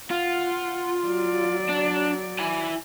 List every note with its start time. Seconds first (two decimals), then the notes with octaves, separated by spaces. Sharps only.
0.11 F4 F#5
1.03 F#3 D5
1.69 D4
2.39 E4 G#5